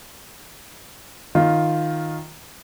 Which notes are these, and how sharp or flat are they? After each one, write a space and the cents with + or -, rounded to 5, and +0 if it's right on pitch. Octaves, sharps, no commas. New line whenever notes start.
D#3 +0 F4 +0